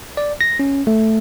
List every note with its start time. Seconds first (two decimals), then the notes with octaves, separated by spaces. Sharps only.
0.17 D5
0.41 A#6
0.60 C#4
0.87 A3